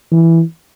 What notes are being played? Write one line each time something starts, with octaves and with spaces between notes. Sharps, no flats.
E3